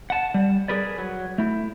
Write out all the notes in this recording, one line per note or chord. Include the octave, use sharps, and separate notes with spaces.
F#5 A5
G3
G#4 A#4 B4 D5
F#3
A3 E4